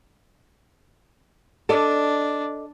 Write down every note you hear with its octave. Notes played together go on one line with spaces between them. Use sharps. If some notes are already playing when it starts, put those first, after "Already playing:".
D4 A4 D5 D#5